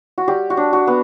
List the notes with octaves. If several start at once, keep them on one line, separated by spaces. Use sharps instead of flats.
F#4
G3 G4
F#4
D4
F#4
B3